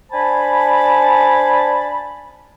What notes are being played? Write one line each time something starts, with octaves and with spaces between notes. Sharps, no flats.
D4 C5 G#5 A5 B5